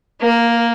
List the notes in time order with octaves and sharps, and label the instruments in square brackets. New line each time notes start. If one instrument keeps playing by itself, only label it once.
[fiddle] A#3